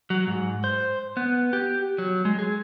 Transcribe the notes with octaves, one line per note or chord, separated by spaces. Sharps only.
F#3
G#2
C5
B3
G4
F#3
G#3
G#4